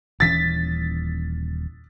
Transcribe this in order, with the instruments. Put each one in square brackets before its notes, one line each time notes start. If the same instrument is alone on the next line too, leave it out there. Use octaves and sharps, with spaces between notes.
[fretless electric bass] D#1 E3 C#4 [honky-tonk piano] A6 B6